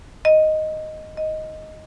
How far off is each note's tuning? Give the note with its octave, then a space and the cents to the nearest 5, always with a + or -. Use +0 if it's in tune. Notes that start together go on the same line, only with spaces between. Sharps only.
D#5 +0
D#5 +5